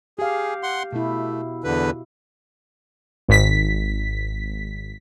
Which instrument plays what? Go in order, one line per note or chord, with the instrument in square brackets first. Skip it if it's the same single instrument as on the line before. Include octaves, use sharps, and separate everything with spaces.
[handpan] G4 F5 [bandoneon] G#4
[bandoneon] F#5 C6
[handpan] B2 E4 [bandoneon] A3
[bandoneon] E2 D3 B4
[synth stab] G#1 B6